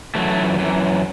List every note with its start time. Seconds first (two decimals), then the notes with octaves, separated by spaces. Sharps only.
0.15 F#2 E3 F#3 A3
0.59 F#2 E3